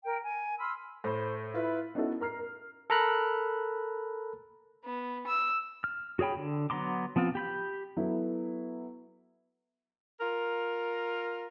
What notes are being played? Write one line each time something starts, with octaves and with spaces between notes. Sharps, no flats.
A#4 G5
G#5
B5 C6 E6 F6
A2 A4 C5 B5
E4 F4 B4
B3 C#4 D#4 E4 F#4 A4
A#4 A#5 F6 C7
A#4
A4 A#4 A#5 B5 F#6
B3
E6
F6
F#4 G#4 C#5 G5 B5
D3
F#3 B3 A#5 C6 D6
F3 B3 C4 F4
G4 B5 G6
F#3 B3 E4 A4
F4 A#4